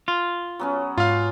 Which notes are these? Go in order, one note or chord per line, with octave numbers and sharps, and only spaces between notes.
F4
F#3 B3 C#4
G#2 F4 F5